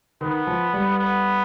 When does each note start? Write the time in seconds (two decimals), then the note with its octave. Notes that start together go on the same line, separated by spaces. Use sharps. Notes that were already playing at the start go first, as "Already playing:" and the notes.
0.21 D#3 B3
0.47 F3
0.73 G3
0.99 B3